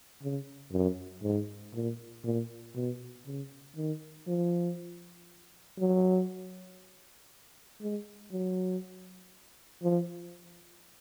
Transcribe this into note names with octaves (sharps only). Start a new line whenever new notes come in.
C#3
F#2
G#2
A#2
A#2
B2
C#3
D#3
F3
F#3
G#3
F#3
F3